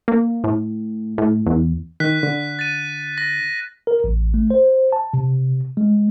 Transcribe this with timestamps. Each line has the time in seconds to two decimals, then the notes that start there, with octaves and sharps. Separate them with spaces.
0.08 A#3
0.44 A2
1.18 A2
1.46 E2
2.00 D#3 F#6 B6
2.23 D3
2.59 A6 D#7
3.18 A#6
3.87 A#4
4.04 A1
4.34 A3
4.50 C5
4.92 A5
5.14 C3
5.77 G#3